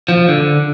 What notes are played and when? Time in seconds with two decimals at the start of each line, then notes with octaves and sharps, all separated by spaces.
0.09 F3
0.28 D3